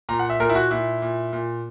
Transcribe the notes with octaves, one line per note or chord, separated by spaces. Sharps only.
A#2 A#5
F#5
E5
A#2 A#4
E4
F#4
A#2 E4
A#2
A#2